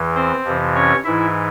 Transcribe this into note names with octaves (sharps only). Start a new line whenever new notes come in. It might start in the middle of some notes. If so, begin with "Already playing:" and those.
Already playing: E2 E3
C4 C5
F2 C3 E3
C#4 C#5
G#2 E3 E4 E5